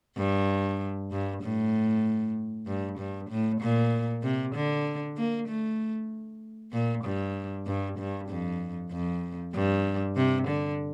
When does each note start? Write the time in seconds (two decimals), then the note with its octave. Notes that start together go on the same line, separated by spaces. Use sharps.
0.17 G2
1.12 G2
1.42 A2
2.67 G2
2.99 G2
3.30 A2
3.61 A#2
4.23 C3
4.55 D3
5.17 A#3
5.48 A3
6.72 A#2
7.04 G2
7.67 G2
7.99 G2
8.29 F2
8.92 F2
9.54 G2
10.17 C3
10.48 D3